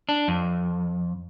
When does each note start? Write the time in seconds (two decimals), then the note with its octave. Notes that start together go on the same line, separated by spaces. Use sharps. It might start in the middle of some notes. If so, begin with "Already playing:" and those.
0.09 D4
0.28 F2